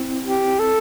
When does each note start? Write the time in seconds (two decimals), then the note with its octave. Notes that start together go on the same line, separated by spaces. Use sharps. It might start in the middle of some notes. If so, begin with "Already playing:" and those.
Already playing: C4 E4
0.25 G4
0.59 A4